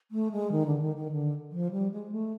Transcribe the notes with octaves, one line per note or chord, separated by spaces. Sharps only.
A3
G#3
D#3
D3
D#3
D#3
D3
F3
G3
G#3
A3